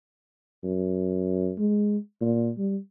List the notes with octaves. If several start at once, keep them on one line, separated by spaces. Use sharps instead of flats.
F#2
G#3
A#2
G3